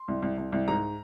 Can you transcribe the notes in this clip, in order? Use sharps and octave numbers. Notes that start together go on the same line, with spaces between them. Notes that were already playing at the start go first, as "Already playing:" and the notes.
Already playing: C6
C2
C2
C2
C2
G#2 A#5